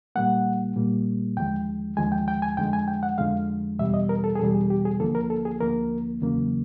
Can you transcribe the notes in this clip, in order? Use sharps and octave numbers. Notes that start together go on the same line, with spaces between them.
A#2 G3 A#3 F#5
A#2 G3 A#3
D#2 D3 F3 G#3 G5
D#2 D3 F3 G#3 G#5
G5
G5
G#5
F2 D3 F3 G#3 G5
G#5
G5
F#5
F2 D3 F3 G#3 F5
E2 B2 G3 E5
D#5
A#4
A4
G#4
E2 B2 G3 A4
G#4
G4
G#4
D2 D3 F3 A#3 A4
A#4
A4
G#4
D2 D3 F3 A#3 A#4
E2 C#3 F#3 A#3